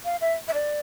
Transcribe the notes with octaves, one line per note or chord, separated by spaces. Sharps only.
F5
E5
E5
D5